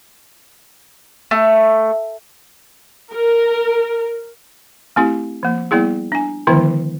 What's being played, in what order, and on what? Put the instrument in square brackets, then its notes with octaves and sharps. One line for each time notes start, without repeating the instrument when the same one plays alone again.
[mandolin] A3
[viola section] A#4
[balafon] A3 C4 E4 G4
F3 A#3
G3 A#3 B3 E4 G#4
D4 G#5
D3 D#3 F3 G#3 B3 E4